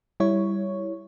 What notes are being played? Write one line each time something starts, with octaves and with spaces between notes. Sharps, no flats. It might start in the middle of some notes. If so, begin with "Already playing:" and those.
G3 E4 C#5